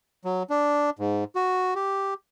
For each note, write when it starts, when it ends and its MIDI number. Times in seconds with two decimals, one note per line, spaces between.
0.25 0.43 54
0.50 0.90 62
0.99 1.24 44
1.35 1.74 66
1.75 2.14 67